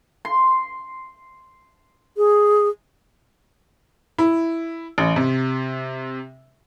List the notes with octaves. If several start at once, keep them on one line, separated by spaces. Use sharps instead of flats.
C6
G#4
E4
A1
C3